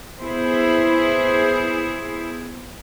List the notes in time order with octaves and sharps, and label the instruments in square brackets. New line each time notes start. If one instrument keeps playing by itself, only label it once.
[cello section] B3 E4 G#4 C5